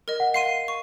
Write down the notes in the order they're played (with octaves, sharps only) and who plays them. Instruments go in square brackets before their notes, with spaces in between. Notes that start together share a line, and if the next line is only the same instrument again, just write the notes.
[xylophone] A#4 D#5
[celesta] F#5
[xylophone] F5 C6 D#7 [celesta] C7
[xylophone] C#6